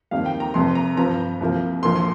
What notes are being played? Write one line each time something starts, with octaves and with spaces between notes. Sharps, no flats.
F2 D#3 G3 A#3 F5
G5
A#5
F1 F2 C3 C6
A#5
G2 F3 C4 A#5
C2 C3 F3 A#3
A#1 A#2 A#3 C6
C6